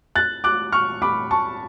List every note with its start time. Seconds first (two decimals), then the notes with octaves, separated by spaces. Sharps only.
0.16 F#6 A6
0.44 D6 F#6
0.72 C#6 F6
1.02 B5 D6
1.31 A5 C#6